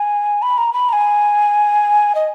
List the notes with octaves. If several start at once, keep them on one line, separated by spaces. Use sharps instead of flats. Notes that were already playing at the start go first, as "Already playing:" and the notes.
Already playing: G#5
B5
A#5
B5
A#5
G#5
D#5